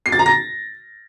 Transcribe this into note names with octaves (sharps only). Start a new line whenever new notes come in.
C7
A6
A#5
A#6